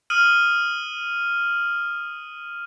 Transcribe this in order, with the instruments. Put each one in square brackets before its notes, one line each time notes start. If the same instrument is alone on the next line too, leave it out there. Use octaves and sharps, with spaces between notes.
[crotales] D#6 F6 D#7 F#7